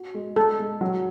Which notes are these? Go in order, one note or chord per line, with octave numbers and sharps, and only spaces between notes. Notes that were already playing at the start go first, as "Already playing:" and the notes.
Already playing: F#4
G#3
G#3 A4
G#3
F#3